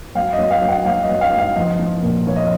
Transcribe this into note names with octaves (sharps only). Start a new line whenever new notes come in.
F#3 F5
D#5
F#3
F5
F#3
F#5
F#3 F5
D#5
F#3
F5
G#2
F5
F3 D#5
F3
A#2
F3 C#5
D#5